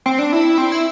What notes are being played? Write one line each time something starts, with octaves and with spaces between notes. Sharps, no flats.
C4
D4
E4
C4
E4